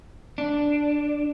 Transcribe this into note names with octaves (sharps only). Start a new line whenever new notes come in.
D4